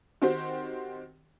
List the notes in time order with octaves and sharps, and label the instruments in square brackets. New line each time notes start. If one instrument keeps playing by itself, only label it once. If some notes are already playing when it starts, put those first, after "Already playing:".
[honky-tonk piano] D#3 C4 F#4 G4 C5